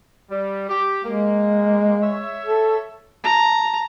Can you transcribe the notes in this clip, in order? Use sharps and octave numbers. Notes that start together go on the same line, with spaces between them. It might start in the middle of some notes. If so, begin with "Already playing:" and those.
G3
G4
G#3 A#3
C#5 E5
A4
A5 A#5